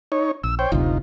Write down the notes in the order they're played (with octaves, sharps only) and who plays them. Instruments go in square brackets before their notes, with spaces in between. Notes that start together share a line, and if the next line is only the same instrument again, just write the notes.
[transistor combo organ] D#4 C#5
[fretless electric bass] A#1 [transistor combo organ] E6
[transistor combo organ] C5 C#5 G5
[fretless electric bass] F#1 D2 C3 [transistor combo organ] D#4 F4